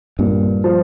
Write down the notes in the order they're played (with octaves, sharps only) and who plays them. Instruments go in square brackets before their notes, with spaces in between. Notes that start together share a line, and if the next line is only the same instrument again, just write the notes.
[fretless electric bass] G2 [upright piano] A#2
[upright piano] F3